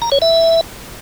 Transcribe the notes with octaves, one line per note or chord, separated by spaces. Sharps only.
A#5
C#5
E5